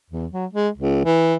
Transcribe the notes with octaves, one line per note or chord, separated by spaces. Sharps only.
E2
F#3
G#3
C#2
E3